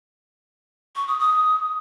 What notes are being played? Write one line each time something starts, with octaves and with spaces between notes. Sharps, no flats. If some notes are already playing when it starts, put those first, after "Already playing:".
C#6
D#6
D#6